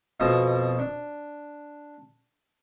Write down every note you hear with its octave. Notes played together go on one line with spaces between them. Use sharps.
F2 B2 F3 D#5 A5
D4